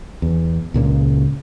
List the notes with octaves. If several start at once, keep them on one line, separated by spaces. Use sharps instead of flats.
E2
C#2 A#2 C#3